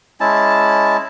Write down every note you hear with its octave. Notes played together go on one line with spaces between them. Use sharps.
G#3 C#4 E4 A5